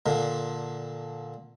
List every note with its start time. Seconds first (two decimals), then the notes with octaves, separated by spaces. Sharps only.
0.06 A#2 D3